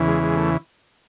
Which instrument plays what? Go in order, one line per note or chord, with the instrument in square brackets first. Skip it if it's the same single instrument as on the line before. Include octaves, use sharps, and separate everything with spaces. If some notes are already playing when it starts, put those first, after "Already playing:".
Already playing: [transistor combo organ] E2 C#3 E3
G#3
G#3
A3